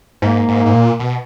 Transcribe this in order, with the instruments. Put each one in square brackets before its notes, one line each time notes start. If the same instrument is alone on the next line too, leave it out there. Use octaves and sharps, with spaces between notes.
[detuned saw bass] G#2 [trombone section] A#3
[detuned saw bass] G#2
G#2
A#2
B2